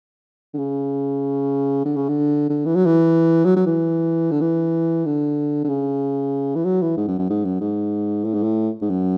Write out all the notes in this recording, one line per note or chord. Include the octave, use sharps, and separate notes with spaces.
D3
C#3
D3
C#3
D3
D3
E3
F#3
E3
F#3
F#3
E3
D3
E3
D3
D3
C#3
E3
F#3
E3
G#2
F#2
F#2
G#2
F#2
G#2
A2
G#2
A2
G#2
F#2